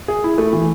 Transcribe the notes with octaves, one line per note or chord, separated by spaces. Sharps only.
G#4
E4
A3
E3